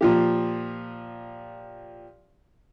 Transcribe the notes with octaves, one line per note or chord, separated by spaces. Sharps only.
A#2 F3 G4